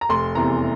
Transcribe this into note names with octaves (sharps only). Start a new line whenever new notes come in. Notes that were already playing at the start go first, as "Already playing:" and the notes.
A#5
F1 C6
E2 C3 E3 A#5